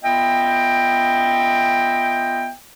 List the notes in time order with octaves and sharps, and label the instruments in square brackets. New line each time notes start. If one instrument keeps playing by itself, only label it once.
[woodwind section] B3 F4 D#5 E5 G5